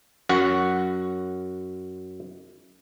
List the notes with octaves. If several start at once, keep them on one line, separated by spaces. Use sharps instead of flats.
F#2 F#4 F#5